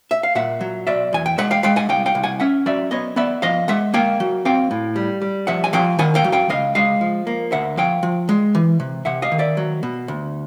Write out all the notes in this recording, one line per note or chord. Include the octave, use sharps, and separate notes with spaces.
E5
F5
A#2 E5 F#5
F#3
B2 D5 E5
E2 G#5
G5
G#3 E5 F#5
F5 G5
G#3 F5 G5
F#5 G#5
C2 F5 G5
F5 G5
C2
F#5 G#5
C#4 E5 F#5
F#3 D5 E5
B3 C#5 D#5
B3 D5 E5
F3 D#5 F5
G#3 E5 F#5
A#3 F5 G5
F#3
C4 F5 G5
A2
G3
G3
F3 E5 F#5
G#5
F3 F5 G5
D#3 F#5 G#5
F5 G5
F#3
F5 G5
C#2 D#5 F5
G#3 D#5 F5
F3
A#3
D2 E5 F#5
F3 F5 G5
F3
G#3
E3
C3
C3 E5 F#5
D#5 F5
D#3
D5 E5
F#3
B2
D2